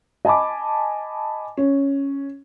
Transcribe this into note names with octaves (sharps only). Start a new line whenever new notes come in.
D#5 G#5 A5 B5 D6
C#4